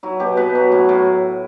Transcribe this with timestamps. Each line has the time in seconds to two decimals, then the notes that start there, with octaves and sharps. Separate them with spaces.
0.03 F#3 E4
0.20 B2 G4
0.37 B2 B4
0.55 F#3
0.72 A2
0.89 A2